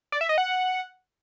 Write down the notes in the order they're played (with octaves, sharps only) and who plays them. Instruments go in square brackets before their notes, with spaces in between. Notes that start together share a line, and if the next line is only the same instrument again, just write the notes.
[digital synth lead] D5
E5
D#5
F#5